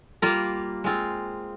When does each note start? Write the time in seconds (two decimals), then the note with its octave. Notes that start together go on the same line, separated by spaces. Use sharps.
0.22 G3 A#3 F4 A#4
0.84 G#3 C4 F4